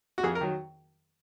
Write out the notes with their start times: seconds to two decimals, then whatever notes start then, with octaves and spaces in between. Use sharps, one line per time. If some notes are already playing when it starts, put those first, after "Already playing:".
0.18 F#4
0.23 F2 G#4
0.35 A#4
0.41 D#3 F#3